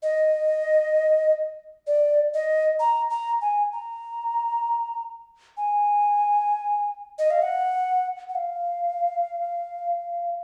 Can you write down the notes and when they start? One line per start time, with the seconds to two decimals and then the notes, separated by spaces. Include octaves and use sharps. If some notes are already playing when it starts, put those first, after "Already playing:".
0.03 D#5
1.87 D5
2.34 D#5
2.79 A#5
3.10 A#5
3.41 G#5
3.73 A#5
5.57 G#5
7.19 D#5
7.30 F5
7.42 F#5
8.29 F#5
8.35 F5